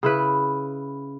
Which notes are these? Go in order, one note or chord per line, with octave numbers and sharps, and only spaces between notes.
C#3 E4 B4